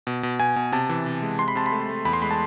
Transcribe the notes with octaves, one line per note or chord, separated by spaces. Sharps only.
B2
B2
B2 G#5
B2
C3 A5
E3
C3
G#3
C3 C6
B5
C3 A5
B5
A3
A3
E2 B5
C6
G#3 B5
A5